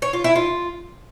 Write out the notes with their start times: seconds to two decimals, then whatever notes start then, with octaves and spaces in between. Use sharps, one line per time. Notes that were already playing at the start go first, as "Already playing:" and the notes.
0.02 C#5
0.13 F4
0.24 E4
0.35 F4